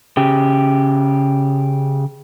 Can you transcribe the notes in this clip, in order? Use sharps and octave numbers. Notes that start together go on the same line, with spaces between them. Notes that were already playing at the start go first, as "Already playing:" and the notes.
C#3 G4